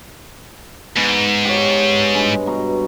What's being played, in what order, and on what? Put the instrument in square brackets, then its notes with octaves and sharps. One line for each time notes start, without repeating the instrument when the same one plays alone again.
[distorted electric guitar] G#2 [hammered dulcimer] B3 D#4
[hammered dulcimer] G4 C#5
G2 G#3
B2 A#5